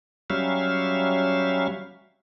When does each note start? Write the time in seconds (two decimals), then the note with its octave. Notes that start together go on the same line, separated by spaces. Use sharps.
0.30 F#3 G3 C#4 E5 F5